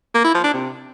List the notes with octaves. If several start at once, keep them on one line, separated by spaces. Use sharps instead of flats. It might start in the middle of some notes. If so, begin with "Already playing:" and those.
A#3
E4
F3
D4
C3